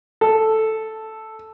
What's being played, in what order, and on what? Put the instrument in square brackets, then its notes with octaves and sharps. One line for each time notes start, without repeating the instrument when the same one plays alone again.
[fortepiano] A4